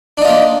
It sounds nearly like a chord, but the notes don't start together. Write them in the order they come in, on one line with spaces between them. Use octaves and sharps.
D4 D#4 F4 A#3